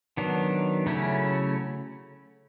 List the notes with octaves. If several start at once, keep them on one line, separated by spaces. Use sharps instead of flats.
D#3 F#3 B3 D4
C#3 F#3 A3 C#4 E4